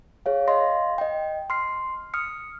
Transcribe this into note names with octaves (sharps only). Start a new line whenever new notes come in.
G#4 C#5 F5
D#5 F5 C6 A#6
D#5 G5
C6 F6 C7
D#6 F6 C#7